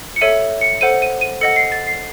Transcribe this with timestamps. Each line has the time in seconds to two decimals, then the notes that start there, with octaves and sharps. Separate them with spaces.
0.16 C#7
0.21 A4 C#5 E5 D#7
0.61 C#7
0.81 A4 C5 F#5 D#7
1.02 D#7
1.21 D#7
1.41 A4 D#5 F#5 C#7
1.56 C7
1.72 A6
1.87 C7